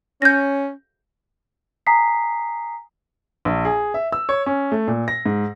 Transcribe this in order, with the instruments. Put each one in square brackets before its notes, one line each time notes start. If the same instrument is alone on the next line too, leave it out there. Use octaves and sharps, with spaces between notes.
[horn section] C#4 [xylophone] G6 A#6
[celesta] G#5 A#5 D#6 B6 C7
[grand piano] A#1
G#4
E5
E6
C#5
C#4
A3
A#2
A#6
G#2